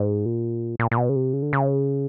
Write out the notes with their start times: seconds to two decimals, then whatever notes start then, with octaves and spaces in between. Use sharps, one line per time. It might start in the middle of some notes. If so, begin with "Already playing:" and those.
Already playing: G#2
0.26 A#2
0.79 A#2
0.91 A#2
0.97 B2
1.09 C#3
1.16 C3
1.33 C#3
1.42 D3
1.53 C#3